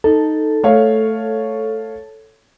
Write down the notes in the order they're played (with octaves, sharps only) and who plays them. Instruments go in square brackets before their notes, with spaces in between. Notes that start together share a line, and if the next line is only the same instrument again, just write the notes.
[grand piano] D#4 [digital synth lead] A4
[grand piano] A3 C#5 F5